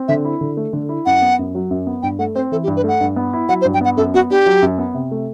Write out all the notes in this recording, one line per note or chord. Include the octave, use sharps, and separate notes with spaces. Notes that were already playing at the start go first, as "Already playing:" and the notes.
Already playing: C4
D3 E5
E4
D3
A3
D3
E4
F#2 F#5
B3
F#2
F#3
F#2
B3
G2 G5
A3 F#5
C4 C5
E3 A4
G4
G2
B4
A3 F#5
G2
B3
E4
F#3 F#5
C5
G2
G5
B3 F#5
F#2 A4
B3 F#4
D4 G4
F#3
F#2
B3
C3
A3